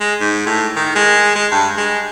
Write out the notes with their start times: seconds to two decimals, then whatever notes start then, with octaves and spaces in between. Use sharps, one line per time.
0.01 G#3
0.20 G#2
0.46 A2
0.76 D#3
0.96 G#3
1.36 G#3
1.52 G2
1.78 G#3